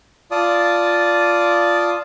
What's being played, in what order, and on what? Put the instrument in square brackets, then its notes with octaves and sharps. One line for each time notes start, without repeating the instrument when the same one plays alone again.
[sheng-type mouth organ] F4 D5 A5 D#6